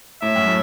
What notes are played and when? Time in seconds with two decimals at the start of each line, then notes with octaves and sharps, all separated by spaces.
0.22 A2 E5
0.36 F#2
0.47 A2